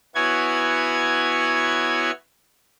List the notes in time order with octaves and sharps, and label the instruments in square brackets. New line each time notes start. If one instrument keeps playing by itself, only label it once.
[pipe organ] B3 E4 F#4 C#5 G#5 G#6